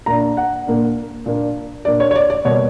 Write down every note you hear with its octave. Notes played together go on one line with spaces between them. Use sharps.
A#2 A#3 D4 A#5
F#5
A#2 A#3 D4
A#2 A#3 D4
A#2 A#3 D4 D5
C#5
C#5
D5
D5
B2 G3 A#3 C#5